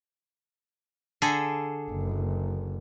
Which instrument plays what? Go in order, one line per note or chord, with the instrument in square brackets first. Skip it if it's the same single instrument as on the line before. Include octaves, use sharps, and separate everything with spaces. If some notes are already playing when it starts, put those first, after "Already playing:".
[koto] D3 G#4 A4
[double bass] F#1